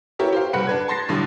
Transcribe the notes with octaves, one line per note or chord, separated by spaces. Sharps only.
B3 E4 G4 A#4 C#5
G4 C5 F5
F#1 G3 B4 F#5 B5 C#7
D4 B4 G#6
A5 C6 A6 A#6 C7
B1 A2 D3 G3